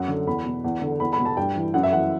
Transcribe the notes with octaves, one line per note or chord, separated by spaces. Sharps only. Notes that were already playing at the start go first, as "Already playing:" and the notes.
Already playing: F#2 F#5
D3
E2 B5
B2
E2
D3
E2 B5
B5
B2
A5
G2 G5
E3
F#2 F#5
E5
E3 F#5